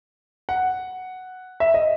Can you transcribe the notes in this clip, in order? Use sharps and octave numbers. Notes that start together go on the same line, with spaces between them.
F#5
E5
D#5